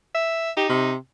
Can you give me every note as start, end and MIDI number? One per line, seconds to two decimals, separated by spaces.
0.15 0.51 76
0.57 0.91 63
0.57 0.68 67
0.69 0.96 48